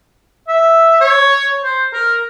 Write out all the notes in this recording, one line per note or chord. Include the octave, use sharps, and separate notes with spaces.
E5
C#5
C5
A#4